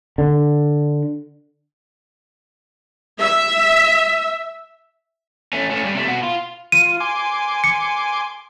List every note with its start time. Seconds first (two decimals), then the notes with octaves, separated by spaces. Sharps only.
0.18 D3
3.20 E5
5.53 A3 C#4
5.70 A3 C#4
5.82 G2 G3
5.94 C3 A3
6.07 B2 F#4
6.23 F4
6.72 F4 D#7
7.00 G#5 C6 D6
7.64 C#7